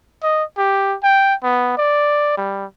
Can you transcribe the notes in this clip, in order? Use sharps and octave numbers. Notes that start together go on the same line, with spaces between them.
D#5
G4
G5
B3
D5
G3